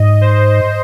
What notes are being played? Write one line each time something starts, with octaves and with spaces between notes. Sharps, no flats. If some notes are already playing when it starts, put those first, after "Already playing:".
Already playing: G#2 D#5
C5